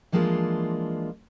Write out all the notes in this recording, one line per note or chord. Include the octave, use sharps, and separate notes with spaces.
E3 F3 G#3 A#3 D4 F4